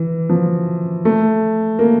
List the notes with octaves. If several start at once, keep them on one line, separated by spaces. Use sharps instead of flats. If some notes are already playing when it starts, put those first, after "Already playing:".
Already playing: E3
F3
A3
A#3